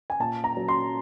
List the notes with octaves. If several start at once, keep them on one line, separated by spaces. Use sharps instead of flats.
G#5
A#2 A5
A#5
F#3
C6